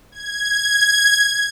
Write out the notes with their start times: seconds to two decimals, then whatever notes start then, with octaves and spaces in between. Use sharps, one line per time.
0.12 G#6